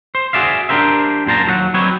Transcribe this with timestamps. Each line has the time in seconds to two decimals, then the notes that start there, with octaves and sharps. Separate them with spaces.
0.15 C5
0.33 F#4 G#4 D5 E5 F5
0.69 D4 D#4 G4 A#4 C5 E5
1.26 F#2 A#2 C5 A5 A#5
1.47 D#2 F#3 D#5 F#5
1.74 F#3 G3 C4 D#4 B4 C#5